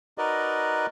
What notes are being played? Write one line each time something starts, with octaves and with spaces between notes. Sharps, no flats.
D#4 F#4 A#4 B4 D5 D#5